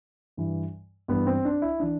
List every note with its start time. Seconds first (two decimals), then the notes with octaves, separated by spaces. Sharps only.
0.37 G2 E3
1.08 G2 E3 B3
1.27 C4
1.45 D4
1.62 E4
1.80 E3 D4